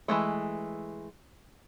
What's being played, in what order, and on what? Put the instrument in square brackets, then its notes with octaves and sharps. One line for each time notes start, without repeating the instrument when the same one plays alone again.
[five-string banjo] E3 G#3 A3